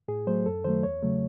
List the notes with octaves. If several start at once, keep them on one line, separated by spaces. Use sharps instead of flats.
A2 G#4
F#3 A3 C5
F#2 A4
D#3 F#3 A3 C5
E2 C#5
C#3 F#3 A3